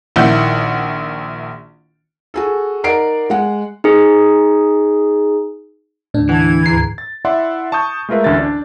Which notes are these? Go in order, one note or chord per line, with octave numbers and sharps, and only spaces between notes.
A#1 D#3 E4 F#5 G6
F#4 G#4 A4
D#4 A#4 D5 F#5 C7 D7
G#3 F#5
D#4 G#4
D#2 A2 D3 D4
E3 F#5 A5 G#6
D2 G#2 A#5 C7
A6
E4 D5 E5 F#5 C6
A5 C#6 D#6 G6
G#3 A3 F4 A#4 B4 E5
A1 D2 D3 F#4 E5 A6
D4 D5